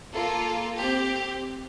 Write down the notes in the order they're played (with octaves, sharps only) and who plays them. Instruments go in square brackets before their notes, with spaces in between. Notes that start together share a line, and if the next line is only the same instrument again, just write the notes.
[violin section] A#3 F4 A4
C4 G4